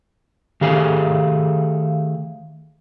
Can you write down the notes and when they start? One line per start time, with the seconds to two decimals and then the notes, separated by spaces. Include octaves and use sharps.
0.61 D#3 A3 G4 G#4 F5 G#5